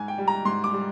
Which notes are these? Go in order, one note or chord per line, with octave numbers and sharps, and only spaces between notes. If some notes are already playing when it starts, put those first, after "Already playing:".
Already playing: G#2 G#5
G5
G3
A#5
G#2 C6
D6
G3